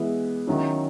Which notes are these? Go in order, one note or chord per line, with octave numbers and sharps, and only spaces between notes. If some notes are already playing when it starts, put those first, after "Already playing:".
Already playing: E3 G#3 B3 E4
D#3 F#3 C#4 E4